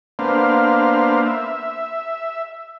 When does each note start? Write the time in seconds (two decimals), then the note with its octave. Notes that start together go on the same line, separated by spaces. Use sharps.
0.19 A#3 B3 D4 C5 F5
1.26 E5